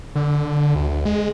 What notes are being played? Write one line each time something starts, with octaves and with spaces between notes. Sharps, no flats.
D3
D2
G#3